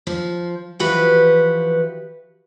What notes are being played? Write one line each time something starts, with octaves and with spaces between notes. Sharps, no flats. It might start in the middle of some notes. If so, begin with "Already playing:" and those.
F3
E3 F3 F#4 G4 B4